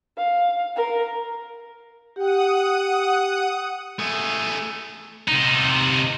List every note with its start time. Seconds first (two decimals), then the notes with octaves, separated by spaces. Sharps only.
0.17 F5
0.76 A#4
2.16 G4 F#5 G5 D#6
3.99 A3 G#4
5.28 C3 D#4